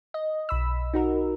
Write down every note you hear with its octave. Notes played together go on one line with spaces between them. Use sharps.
D#5
B1 B5 E6
D#4 F#4 A#4